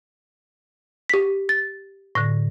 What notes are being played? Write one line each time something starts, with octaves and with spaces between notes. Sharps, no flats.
G4 B6
A6
A2 D3 A#6